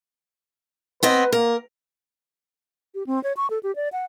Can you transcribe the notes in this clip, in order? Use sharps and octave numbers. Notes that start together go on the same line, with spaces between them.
B3 C4 B4 D#5
A#3 A#4
G4
C4
C#5
C#6
A4
G4
D5
F#5